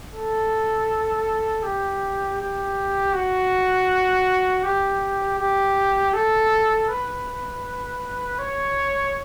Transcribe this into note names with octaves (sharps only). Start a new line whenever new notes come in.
A4
G4
G4
F#4
G4
G4
A4
B4
C#5